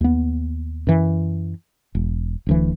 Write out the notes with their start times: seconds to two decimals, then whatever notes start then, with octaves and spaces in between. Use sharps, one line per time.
0.01 D#2 B3
0.87 F#2 E3
1.95 E1
2.46 D1 D2 E3